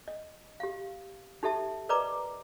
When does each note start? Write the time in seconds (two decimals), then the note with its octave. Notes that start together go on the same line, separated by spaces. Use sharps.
0.08 D#5
0.60 G4 F5
1.43 D#4 G4 A4 E5 A5
1.89 A#4 B4 D5 D#5 A#5 D6